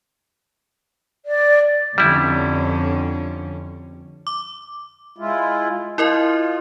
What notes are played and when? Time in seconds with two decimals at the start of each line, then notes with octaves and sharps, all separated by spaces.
1.26 D5
1.98 F2 D3 G3 C#4 E4
4.27 D6
5.18 G#3 E4 F4
5.98 E4 F4 A#4 D#5